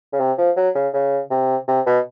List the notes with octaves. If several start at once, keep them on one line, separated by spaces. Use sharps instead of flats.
C#3
C3
F3
F#3
C#3
C#3
C3
C3
B2